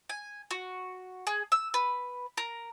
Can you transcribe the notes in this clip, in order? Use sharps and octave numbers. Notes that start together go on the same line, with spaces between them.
G#5
F#4
G#4
E6
B4
A#4